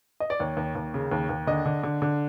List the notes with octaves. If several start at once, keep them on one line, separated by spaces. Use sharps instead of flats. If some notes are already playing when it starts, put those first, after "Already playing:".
D#5
D5
D#2 C#5
D#2
D#2
C#3
D#2
D#2
D3 D#5
D3
D3
D3